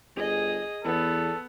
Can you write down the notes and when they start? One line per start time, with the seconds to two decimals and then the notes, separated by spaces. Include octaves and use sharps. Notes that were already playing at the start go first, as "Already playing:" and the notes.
0.16 G1 G#4 D#5
0.85 E2 B3 A4